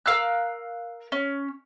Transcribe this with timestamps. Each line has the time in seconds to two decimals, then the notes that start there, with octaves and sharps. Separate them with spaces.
0.06 A#4 F5 E6 F#6
1.12 C#4